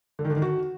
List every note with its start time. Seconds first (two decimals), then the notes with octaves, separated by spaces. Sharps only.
0.19 D3
0.25 D#3
0.30 D3
0.36 D#3
0.42 F#4